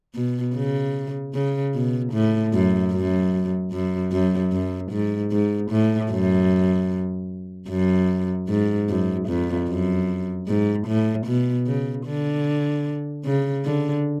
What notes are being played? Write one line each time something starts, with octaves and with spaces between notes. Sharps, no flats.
B2
C#3
C#3
B2
A2
F#2
F#2
F#2
F#2
F#2
G#2
G#2
A2
F#2
F#2
G#2
F#2
F2
F#2
G#2
A2
B2
C#3
D3
C#3
D3